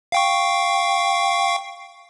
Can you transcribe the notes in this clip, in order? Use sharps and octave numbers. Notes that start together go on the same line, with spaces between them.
F5 G5 C#6